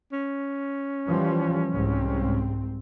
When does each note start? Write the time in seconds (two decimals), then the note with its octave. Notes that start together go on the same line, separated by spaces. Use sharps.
0.12 C#4
1.08 E3 F3 G3
1.71 C2 G#2 C4